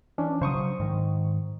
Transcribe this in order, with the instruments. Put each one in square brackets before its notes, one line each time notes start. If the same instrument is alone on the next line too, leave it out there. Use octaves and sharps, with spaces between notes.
[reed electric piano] E3 C#4 D4
[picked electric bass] C#3 F#3 [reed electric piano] C5 C#6 D#6
[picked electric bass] G#2 D#3